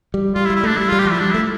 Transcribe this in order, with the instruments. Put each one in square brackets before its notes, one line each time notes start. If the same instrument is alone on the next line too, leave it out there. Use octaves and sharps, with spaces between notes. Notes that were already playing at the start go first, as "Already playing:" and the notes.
[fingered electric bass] G3
[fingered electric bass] G3 [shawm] F4
[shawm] E4
[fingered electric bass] G3
[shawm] E4
[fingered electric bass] A3 [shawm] D4
[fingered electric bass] G3 [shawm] E4
[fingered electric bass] G3 [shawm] F4
[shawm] G4
[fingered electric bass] F3 [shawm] E4
[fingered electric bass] G3 [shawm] D4
[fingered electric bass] A3 [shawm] E4